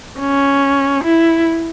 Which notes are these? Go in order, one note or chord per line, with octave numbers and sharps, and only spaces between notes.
C#4
E4